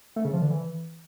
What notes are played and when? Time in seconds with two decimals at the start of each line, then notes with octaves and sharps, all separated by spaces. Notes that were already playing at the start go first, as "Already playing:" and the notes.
0.16 A3
0.25 C#3
0.33 F3
0.42 D3
0.50 E3